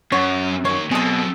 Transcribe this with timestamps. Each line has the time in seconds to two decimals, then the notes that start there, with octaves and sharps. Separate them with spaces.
0.12 F#2 C#4 C#5 F#5
0.65 D#3 A#3 C#5
0.91 B2 F#3 C4 G#4 A4